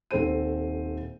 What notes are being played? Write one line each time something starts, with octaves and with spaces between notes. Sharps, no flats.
D#1 D#3 C4 A4 C5 D#7